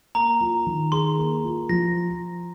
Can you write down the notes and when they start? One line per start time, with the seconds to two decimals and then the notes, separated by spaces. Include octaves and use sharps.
0.15 A#3 A#5
0.41 F4
0.66 D#3
0.92 G#4 C6
1.18 A#3
1.44 F4
1.69 F3 A#6